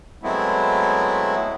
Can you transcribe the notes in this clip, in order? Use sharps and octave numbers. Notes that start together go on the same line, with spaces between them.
F#3 G#3 A3 B3 C4 E4